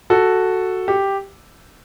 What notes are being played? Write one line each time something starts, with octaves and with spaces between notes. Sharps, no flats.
F#4 A4
G4